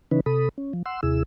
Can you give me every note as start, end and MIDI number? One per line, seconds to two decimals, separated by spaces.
0.11 0.20 49
0.11 0.20 52
0.11 0.20 61
0.11 0.20 63
0.11 0.20 71
0.26 0.49 48
0.26 0.49 69
0.26 0.49 83
0.26 0.49 87
0.58 0.73 61
0.73 0.83 53
0.86 1.01 78
0.86 1.01 84
0.86 1.01 88
1.03 1.23 39
1.03 1.23 48
1.03 1.23 64
1.03 1.23 68
1.03 1.23 88